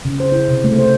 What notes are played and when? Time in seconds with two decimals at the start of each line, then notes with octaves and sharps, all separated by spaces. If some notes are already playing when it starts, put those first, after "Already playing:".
0.05 C#3
0.20 C5
0.32 E4
0.48 C3
0.64 A3
0.78 C5